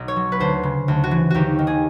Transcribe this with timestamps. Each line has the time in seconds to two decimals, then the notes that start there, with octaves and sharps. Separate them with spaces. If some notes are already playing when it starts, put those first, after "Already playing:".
Already playing: B1
0.08 C#5
0.16 F#3
0.32 B4
0.40 D2 C5
0.63 C#3
0.88 D2
1.04 F#4
1.11 E3
1.30 D#2 F#4 G4
1.59 D#3
1.67 G#4